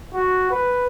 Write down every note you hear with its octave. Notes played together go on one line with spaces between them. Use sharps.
F#4
B4